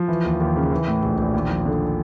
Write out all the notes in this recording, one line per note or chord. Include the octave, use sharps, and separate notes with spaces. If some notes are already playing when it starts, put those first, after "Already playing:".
Already playing: F3
E3
D#2
D#2
C#3
E3
A2
A#1
A#1
D#2
F3
D3